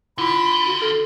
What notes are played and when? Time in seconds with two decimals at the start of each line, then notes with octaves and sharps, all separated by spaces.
0.18 D3 E4 F4 B5
0.67 F#4
0.82 A4